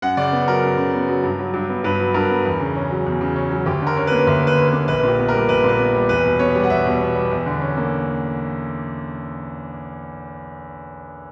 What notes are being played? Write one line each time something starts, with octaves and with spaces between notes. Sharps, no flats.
F#2 F#5
C#3 D5
B3
F#3 A#4
F#2
C#3
B3
F#3
G2
F#3
G2
B3
G2 B4
F#3
G2 A#4
B3
E2
C#3
C#4
F#3
E2
C#3
C#4
F#3
D2 G4
D3 A#4
C#4
A#3 B4
D2 B4
D3 B4
C#4
B4
A#3
A#1 B4
A#2
G4
B3
G3 A#4
A#1 B4
A#2
B4
B3
G3
E2 B4
B2
B3 C#5
G3
F#5
E2 E5
B2
B3
G3
E2
D3
C#4
A#3